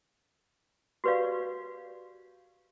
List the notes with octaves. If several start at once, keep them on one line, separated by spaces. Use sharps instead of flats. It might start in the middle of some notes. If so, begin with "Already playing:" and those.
F#4 G4 B4 C#5 D5 F5